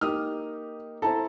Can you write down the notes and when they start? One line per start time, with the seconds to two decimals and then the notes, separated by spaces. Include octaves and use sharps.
0.01 A#3 D#4 G4 D#6 F6
1.02 C4 E4 A4 A5 A#5